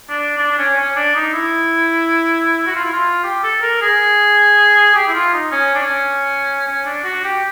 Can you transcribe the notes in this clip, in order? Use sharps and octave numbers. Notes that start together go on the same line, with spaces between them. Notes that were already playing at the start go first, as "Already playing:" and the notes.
D4
D4
D4
C#4
C#4
D4
D#4
E4
F#4
F4
E4
F4
G4
A4
A#4
G#4
G4
E4
F4
D#4
C#4
D4
C#4
C#4
D4
F#4
G4